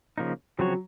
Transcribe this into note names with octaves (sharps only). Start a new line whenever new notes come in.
C#3 F3 A#3 D#4
C#3 F3 F#3 C4 F#4 C#5